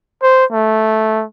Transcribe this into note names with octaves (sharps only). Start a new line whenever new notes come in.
C5
A3